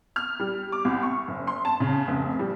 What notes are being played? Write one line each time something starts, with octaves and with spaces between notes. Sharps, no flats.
F6
G3
D6
C2
C#6
F#1
C6
A5
C#3
F1
G3